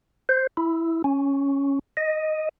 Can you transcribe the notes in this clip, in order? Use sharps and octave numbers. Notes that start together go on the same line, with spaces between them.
C5
E4
C#4
D#5